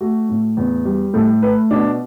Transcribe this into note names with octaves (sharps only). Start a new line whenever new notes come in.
A3 F#4
A2
E2
G3
A2 A4
A3 B4
B2 D4